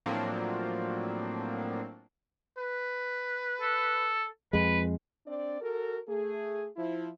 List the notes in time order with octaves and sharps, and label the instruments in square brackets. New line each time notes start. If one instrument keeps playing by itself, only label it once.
[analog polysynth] A2 F3 F#3 A#3 C4 D4
[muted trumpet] B4
[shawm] A4
[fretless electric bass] F2 G#3 [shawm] B4
[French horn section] C4 D4 D5
F#4 A4 A#4
A3 G#4
F3 E4